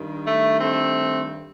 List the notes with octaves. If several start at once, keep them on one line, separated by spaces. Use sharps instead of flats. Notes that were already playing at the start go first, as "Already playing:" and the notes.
Already playing: G2 D#3
A3
A3 C4